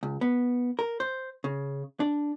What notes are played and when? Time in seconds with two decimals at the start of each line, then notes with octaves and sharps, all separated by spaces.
0.03 C#2
0.21 B3
0.79 A#4
1.00 C5
1.44 C#3
2.00 D4